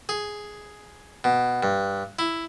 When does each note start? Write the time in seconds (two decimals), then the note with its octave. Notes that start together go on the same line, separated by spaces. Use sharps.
0.09 G#4
1.24 B2
1.63 G2
2.19 E4